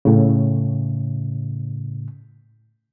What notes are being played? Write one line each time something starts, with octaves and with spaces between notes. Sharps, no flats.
A2 C#3